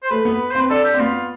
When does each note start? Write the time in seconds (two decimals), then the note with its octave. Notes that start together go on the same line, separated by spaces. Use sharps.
0.03 C5
0.10 A3 B4
0.25 B3
0.51 C4 C5
0.60 B4
0.70 D4 A4
0.84 G4
0.94 C4
0.99 B3 F4